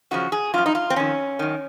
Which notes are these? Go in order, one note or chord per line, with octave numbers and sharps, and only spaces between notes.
F#2 C#3 F3 F#4
G#4
F#2 F3 F4
D#4
F4
C4
F2 D#3 C#4
F#2 D#3